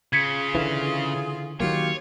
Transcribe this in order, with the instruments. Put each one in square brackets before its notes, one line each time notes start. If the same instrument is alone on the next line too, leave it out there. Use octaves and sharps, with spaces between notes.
[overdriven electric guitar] C#3 [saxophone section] F4 G#4 [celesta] G#6 B6 C#7
[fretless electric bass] D3 E3
[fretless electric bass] D#3 F#3 A#3 [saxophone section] F4 G4 F5 [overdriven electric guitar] C#5